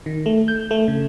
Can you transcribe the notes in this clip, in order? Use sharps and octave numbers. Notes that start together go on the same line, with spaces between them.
D#3
A3
G6
A3
C#3